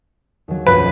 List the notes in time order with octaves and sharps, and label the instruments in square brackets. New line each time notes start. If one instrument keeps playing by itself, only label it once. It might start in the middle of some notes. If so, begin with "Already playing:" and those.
[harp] D#2 F#3
[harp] B1 F#2 F4 [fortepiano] B4